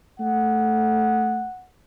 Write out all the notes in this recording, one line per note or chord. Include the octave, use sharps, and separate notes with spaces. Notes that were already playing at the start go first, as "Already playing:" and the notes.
A3 F#5